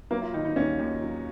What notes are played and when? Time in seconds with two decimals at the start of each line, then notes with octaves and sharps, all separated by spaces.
0.11 F#3 A#3
0.22 F4
0.33 D#3 D#4
0.45 D#4
0.56 D#2 C#4
0.79 D#2
1.02 F#3